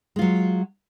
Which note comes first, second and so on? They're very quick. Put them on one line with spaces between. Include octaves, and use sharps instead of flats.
G#3 F4 F#3